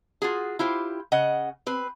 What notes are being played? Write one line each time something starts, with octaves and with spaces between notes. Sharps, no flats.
F4 F#4 G#4
E4 F4 G4 C5
C#3 D#5 F#5
C4 B4